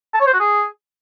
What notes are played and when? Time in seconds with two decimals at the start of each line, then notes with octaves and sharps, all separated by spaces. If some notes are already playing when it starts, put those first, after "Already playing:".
0.14 A5
0.20 C#5
0.27 C5
0.33 F#4
0.40 G#4